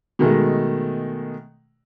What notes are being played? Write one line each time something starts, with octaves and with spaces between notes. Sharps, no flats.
B2 D#3 G#3 A3